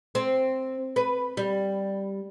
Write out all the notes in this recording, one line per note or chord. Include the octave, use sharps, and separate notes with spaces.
C4
B4
G3